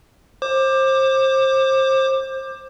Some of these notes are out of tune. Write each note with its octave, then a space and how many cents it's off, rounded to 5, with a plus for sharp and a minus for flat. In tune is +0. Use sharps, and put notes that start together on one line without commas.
C5 +25 D6 +15